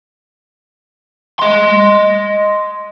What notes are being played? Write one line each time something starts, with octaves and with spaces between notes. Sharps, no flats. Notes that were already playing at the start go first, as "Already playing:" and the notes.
D#5 C6